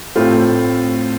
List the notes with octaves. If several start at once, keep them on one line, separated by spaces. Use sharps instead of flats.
A2 A3 C4 F4